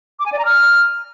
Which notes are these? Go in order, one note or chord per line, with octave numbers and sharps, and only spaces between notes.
D6
G#5
D5
A#5
F6